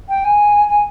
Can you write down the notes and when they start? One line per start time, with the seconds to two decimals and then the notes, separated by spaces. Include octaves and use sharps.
0.09 G5
0.25 G#5
0.68 G#5